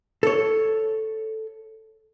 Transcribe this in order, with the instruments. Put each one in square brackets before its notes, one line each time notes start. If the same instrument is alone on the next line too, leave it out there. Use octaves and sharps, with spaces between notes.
[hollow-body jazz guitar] A4 C#5